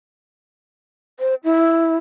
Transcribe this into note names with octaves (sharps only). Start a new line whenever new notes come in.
C5
E4